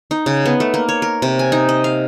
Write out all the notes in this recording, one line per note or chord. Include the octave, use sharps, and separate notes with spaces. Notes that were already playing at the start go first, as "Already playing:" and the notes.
D#4
C#3
B3
A3
A#3
C#5
A#4
C3
G#5
D#4
D#5
F5